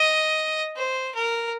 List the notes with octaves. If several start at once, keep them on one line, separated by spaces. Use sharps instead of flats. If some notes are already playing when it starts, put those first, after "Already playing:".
Already playing: D#5
C5
A#4